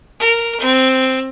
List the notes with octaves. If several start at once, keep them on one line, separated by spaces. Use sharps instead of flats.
A#4
C4